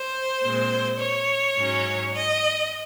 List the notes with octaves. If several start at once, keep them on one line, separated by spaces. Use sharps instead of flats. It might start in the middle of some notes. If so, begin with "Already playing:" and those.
Already playing: C5
A#2 G#3 C4
C#5
G#2 F#3 C#4
D#5